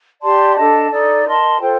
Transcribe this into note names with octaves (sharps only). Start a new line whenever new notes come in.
G4 D5 A5 C6
D4 A4 D#5 A5
D#4 A4 D5
A#4 D#5 A5 C6
F4 A4 C5 G5